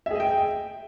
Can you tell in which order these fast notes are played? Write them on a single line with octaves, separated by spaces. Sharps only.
E5 G#4 D#5 G5